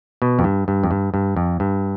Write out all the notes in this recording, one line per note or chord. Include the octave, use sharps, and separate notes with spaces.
B2
F2
G2
G2
F2
G2
G2
F2
G2